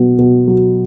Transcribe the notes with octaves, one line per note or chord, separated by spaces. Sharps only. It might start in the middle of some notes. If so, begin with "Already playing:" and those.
Already playing: B2 F#3 B3
B2
F#3